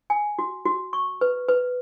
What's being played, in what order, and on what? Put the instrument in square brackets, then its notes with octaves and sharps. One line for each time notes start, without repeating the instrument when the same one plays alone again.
[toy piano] G#5
F#4
F#4
C#6
B4
B4